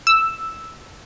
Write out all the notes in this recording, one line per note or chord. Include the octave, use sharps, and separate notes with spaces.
E6